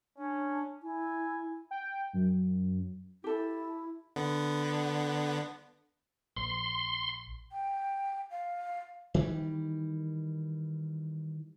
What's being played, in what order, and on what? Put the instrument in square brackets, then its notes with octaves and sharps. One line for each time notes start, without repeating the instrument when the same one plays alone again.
[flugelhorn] C#4 [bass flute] D4
[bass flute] E4 [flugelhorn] G#5
[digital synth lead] G5
F#2
[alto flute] E4 [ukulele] G4 A4
[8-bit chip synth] D3 B3
[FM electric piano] A#1 [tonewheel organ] C6
[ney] G5
F5
[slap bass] D#3 E3 G3